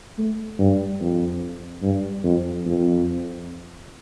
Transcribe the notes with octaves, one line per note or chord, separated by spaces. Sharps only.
A3
G2
F2
G2
F2
F2